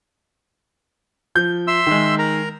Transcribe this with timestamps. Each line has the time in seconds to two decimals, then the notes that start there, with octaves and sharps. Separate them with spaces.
1.35 F3 G6
1.67 E5 C6 E6
1.87 D#3 G#3
2.19 A#4 A#5